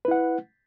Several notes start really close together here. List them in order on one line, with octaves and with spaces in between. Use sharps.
B4 E4 F#5